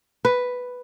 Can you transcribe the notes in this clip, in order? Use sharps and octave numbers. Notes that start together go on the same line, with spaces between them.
B4